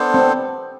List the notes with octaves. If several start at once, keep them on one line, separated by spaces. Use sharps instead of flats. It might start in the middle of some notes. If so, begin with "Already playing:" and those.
Already playing: B3 D4 A4 C5
C4